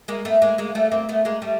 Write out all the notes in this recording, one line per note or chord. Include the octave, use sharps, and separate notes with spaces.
G#3 A#3
A3 B3
G#3 A#3
G#3 A#3
G3 A3
A#3 C4
A3 B3
G#3 A#3
G3 A3